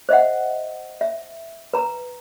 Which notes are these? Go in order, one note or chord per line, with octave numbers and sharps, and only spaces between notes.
C5 D#5 E5 F#5
E5
B4 A#5